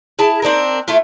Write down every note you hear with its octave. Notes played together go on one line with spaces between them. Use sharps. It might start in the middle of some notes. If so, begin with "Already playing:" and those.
E4 G#4 A5
C4 D4 D#4 A#4
A3 E4 F4